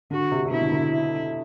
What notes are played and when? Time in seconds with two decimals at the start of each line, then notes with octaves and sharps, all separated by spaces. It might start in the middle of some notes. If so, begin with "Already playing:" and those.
0.11 D3 F#4
0.32 C3
0.45 C3
0.51 B2 E4
0.62 D3
0.72 D3
0.92 E4